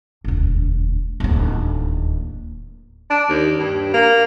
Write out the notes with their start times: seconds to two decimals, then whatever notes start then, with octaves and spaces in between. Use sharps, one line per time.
0.24 E1 D2
1.20 D1 D#2
3.10 D4
3.29 D#2
3.59 G2
3.94 A#3